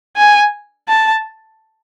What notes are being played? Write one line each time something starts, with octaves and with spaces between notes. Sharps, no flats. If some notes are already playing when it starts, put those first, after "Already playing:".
G#5
A5